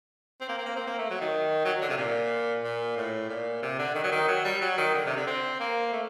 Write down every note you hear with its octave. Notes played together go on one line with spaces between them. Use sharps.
C4
A#3
C4
A#3
C4
A#3
A3
F#3
D#3
F#3
D3
C3
A#2
A#2
A2
A#2
C3
D3
D#3
F#3
D#3
F#3
G3
F#3
D#3
D3
C3
D3
C4
A#3
A3